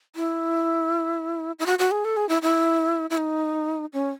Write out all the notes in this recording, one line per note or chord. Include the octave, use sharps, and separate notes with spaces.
E4
E4
F#4
F#4
G#4
A4
G#4
E4
E4
E4
D#4
C#4